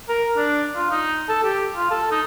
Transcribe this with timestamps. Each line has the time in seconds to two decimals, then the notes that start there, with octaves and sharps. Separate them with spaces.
0.09 A#4
0.37 D4
0.76 F4
0.91 D#4
1.29 A4
1.44 G4
1.76 F4
1.91 A4
2.11 D#4